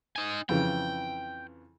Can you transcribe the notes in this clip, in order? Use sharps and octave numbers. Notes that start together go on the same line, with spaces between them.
D#4 G#5
F2 C#3 E3 G5